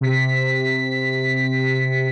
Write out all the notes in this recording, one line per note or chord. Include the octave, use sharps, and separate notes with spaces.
C3 B6